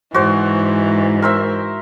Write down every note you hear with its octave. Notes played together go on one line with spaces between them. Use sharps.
G#2 E3 F#4 C5 D5
A#4 C5 E5